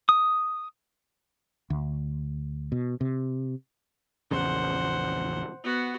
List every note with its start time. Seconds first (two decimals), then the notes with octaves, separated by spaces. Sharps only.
0.09 D#6
1.70 D2
2.72 B2
3.01 C3
4.31 A#1 E2 C#3 C5 F#5
5.63 B3 F#4